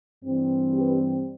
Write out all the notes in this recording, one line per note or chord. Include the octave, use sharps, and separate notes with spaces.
G2 E3 G3 C4
G4 B4